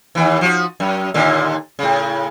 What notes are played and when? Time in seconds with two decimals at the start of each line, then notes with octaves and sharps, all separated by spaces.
0.15 D#2 E3
0.41 F3 F#4
0.80 F#2
1.14 D#2 A#2 D3
1.79 A2 C#3